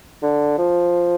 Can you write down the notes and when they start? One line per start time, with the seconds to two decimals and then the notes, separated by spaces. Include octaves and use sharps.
0.23 D3
0.58 F3